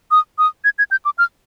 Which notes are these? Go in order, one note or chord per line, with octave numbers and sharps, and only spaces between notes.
D#6
D#6
G#6
G#6
G6
D6
F6